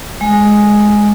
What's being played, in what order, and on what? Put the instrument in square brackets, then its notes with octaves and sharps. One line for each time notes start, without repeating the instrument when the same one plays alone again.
[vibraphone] G#3